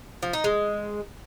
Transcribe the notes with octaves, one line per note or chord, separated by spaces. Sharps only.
F3
D#4
G#3